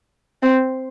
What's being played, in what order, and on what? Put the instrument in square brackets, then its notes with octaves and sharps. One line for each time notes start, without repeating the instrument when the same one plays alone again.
[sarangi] C4